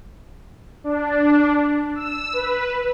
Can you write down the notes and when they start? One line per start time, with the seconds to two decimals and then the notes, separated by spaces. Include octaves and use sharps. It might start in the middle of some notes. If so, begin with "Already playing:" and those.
0.84 D4
1.95 E6
2.33 B4